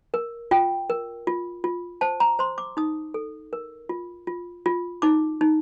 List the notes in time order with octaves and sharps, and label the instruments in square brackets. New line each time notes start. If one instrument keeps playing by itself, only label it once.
[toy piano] A#4
F4 G5
A#4
F4
F4
C5 A5
A#5
C5 C6
D6
D#4 D#6
A4
A#4
F4
F4
F4
D#4 D6
D#4